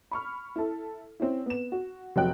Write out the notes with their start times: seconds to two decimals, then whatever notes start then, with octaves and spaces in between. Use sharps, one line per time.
0.11 B5 C#6 F6
0.56 E4 A4
1.20 C4 C#4 E4
1.46 B3 E7
1.72 F#4
2.16 F1 F#3 F#4 D#5 G5 F#6